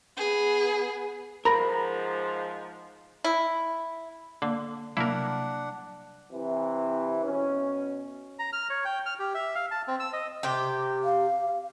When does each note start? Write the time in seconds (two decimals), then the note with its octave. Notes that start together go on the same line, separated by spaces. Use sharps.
0.17 B3 G#4
1.45 G#2 F3 A#4 A#5 B5 A#6
3.24 E4
4.42 D3 A#3
4.97 C3 F#3 G3 A#3 D4 E4 A#4 F#5
6.32 C3 E3
7.24 B2 C#4
8.39 A#5
8.53 F6
8.70 C#5
8.85 G5
9.06 F6
9.19 G4
9.35 E5
9.55 F5
9.71 A5
9.88 C4
10.00 E6
10.13 D#5
10.43 C3 G4
11.04 F5